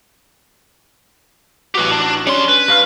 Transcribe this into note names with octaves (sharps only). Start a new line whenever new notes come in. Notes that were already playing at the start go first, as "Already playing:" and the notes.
A1 F#4 G4 B4
D4
G3 C#4 D4 C6
B4
G2 F5 F6